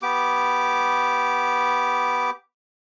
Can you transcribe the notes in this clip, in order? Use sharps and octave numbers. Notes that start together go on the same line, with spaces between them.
B3 G4 D6